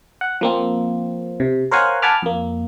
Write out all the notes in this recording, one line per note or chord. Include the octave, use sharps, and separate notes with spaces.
F#5
F3 A#3 C4
C3
A#4 C5 C#5 F5 F#5 G#5
F#5 G#5 A5 B5 D6 F6
F2 A#3